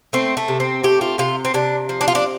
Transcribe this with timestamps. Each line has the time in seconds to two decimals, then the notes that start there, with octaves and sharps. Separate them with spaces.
0.13 A3 C4
0.37 A3
0.48 C3
0.60 C4
0.83 A3 G4
1.01 F4
1.18 C3 F4
1.45 C4
1.54 C3 D4
1.89 F3
2.01 D4
2.08 F4
2.15 D4